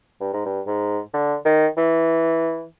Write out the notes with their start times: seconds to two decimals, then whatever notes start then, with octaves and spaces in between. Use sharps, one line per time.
0.21 G2
0.33 G#2
0.46 G2
0.67 G#2
1.14 D3
1.45 D#3
1.77 E3